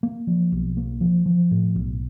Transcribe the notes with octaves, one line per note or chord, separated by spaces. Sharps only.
A#3
F3
B1
A#3
F3
F3
A2
B1